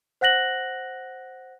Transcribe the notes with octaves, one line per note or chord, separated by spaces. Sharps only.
C5 F#5 F#6 A#6 F#7